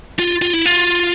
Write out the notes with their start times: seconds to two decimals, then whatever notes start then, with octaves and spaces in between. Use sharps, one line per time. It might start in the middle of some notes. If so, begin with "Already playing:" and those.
0.19 F4
0.42 F4
0.53 E4
0.66 F4